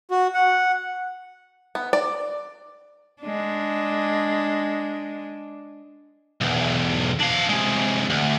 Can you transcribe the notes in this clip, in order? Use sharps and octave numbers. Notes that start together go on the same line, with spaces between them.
F#4
F#5
B3
D5
G#3 D4
B1 E2
D4 F5
C3 G#3
D2